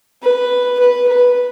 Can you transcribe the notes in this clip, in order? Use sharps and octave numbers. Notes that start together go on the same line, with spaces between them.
B4
B4
B4